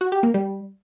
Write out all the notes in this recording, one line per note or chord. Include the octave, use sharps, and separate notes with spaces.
F#4
G4
A#3
G3